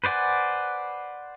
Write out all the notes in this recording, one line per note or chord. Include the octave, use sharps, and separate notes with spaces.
B4 C5 D5 F#5 G#5